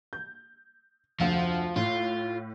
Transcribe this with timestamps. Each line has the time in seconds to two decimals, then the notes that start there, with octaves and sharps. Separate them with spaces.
0.13 G6
1.20 F1 D2 F3 F5
1.76 A2 F4